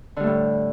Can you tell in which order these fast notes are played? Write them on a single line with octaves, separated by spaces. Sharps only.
D3 G3 A3 A2